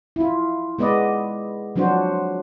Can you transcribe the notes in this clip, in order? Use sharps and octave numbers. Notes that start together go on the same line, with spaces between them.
E4 F4
G#3 B3 B4 D5 D#5
F3 F#3 D4 F#4 C5